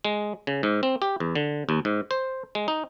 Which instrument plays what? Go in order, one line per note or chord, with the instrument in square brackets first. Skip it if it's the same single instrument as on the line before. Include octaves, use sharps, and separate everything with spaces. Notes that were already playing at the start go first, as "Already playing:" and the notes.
[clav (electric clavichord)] G#3
C#3
G#2
C4
G4
E2
D3
D#2
G#2
C5
G#3
D#4